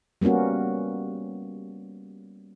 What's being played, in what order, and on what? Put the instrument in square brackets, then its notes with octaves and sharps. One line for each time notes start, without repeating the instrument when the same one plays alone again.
[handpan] G3 A#3 B3 C#4 F#4